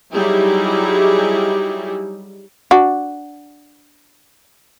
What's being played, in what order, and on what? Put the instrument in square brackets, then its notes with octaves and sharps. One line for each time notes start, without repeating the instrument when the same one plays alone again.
[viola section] F#3 G3 D#4 E4 G4 G#4
[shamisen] D4 F#4